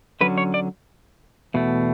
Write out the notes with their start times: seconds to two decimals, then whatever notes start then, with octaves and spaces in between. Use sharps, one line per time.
0.21 D3 F#3 C#4 B4
0.38 C#5
0.54 D5
1.54 E2 B2 A3